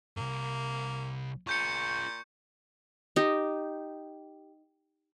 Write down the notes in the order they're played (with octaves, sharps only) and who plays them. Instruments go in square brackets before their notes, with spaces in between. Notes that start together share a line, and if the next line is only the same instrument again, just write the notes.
[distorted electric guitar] C2 G#2 [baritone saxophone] A#3
[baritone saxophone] A#2 [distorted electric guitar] F4 G#4 [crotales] C#6 G6 C#7
[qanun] D#4 G4